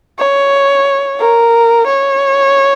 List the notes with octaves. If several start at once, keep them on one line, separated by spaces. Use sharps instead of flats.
C#5
A#4
C#5